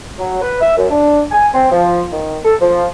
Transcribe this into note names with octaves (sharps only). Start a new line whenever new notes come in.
F#3
B4
E5
F#2
D4
G#5
C4
F3
D#3
A4
F3